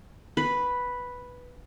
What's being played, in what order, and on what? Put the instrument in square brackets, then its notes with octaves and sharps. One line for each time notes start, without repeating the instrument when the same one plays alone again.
[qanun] B4